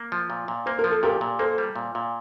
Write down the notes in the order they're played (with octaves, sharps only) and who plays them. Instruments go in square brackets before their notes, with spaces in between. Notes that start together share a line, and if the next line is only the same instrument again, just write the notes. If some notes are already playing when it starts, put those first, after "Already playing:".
Already playing: [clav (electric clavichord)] A#3
F3
A#2
A#2
[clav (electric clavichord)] A#3 [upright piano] C5
[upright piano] A#4
[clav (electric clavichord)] F3
[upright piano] A4
[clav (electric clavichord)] A#2 [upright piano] G4 A#4
[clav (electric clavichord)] A#2
[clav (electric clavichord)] A#3 [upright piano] A4 C5
[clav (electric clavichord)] G3
A#2
A#2